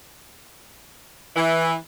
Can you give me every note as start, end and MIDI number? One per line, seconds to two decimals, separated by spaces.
1.36 1.73 52